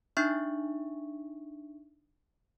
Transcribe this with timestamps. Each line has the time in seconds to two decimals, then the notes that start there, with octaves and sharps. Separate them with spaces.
0.17 D4 D#4 E5 C#6